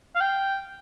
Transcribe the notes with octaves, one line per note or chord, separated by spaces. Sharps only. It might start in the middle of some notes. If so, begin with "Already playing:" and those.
F5
G5